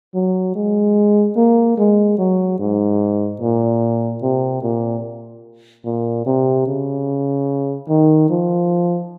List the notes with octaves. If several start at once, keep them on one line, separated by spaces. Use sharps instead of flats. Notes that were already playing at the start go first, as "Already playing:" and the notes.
F#3
G#3
A#3
G#3
F#3
G#2
A#2
C3
A#2
A#2
C3
C#3
D#3
F3